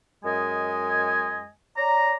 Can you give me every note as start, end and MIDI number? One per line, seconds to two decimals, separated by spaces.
0.25 1.48 42
0.25 1.48 56
0.25 1.48 75
0.25 1.48 80
1.76 2.15 73
1.76 2.15 74
1.76 2.15 82